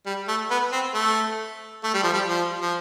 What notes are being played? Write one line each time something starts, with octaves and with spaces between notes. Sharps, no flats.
G3
A3
B3
C4
A3
A3
G3
F3
G3
F3
F3